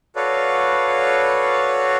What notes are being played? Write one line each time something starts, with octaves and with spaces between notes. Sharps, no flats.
F#4 A4 B4 C#5 D5 F5